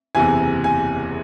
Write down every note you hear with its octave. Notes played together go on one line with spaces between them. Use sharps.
F#1 E2 C3 E3 G#5
G#5